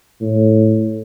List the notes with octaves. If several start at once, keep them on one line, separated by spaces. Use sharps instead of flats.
A2